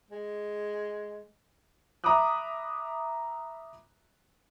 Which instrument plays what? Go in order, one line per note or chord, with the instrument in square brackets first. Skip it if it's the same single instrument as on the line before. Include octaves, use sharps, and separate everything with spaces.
[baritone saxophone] G#3
[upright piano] E5 A#5 B5 D6 D#6 F#6